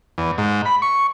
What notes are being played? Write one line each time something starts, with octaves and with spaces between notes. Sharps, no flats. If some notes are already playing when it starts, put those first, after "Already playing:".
E2
G#2
B5
C#6